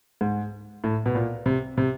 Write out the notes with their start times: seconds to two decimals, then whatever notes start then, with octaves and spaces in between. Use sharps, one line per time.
0.21 G#2
0.84 A2
1.06 B2
1.15 A#2
1.46 C3
1.77 C3